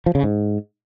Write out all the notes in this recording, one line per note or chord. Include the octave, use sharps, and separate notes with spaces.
F3
C#3
G#2